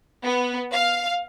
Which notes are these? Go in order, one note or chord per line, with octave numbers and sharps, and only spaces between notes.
B3
F5